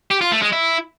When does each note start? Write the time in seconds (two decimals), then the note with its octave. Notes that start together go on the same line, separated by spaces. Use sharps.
0.11 G4
0.21 F4
0.32 A3
0.42 G#3
0.53 E4